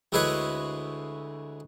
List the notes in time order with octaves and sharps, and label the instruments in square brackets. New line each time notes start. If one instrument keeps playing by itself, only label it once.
[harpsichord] D2 G#3 E4 G#4 B4 C#5